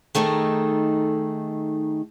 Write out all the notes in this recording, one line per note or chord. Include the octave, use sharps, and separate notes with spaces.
D#3 A3 D#4 G#4 A4